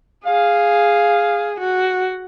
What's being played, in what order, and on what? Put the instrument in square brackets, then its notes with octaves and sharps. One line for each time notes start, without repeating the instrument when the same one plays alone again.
[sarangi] G#4 [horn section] F5
[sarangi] F#4